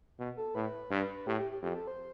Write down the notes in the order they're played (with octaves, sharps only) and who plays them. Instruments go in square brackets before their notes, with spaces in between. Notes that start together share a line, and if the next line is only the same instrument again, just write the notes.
[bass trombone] B2
[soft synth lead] A4
[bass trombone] A2 [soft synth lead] B4
[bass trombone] G2
[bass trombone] A2 [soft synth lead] G4
[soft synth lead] G4
G4
[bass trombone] F2 [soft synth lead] G4
[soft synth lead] A4
C5